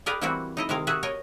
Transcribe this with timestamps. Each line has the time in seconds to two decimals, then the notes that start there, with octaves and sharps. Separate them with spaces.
0.06 G4 G#4 A#4 B4 D5 F5
0.21 E3 G3 A#3 C4 E4 F#4
0.57 D#4 E4 D#5
0.69 C3 D#3 G#3 A#4 F5
0.87 F#4 G#4 E5 F#5
1.03 A#4 C#5 D#5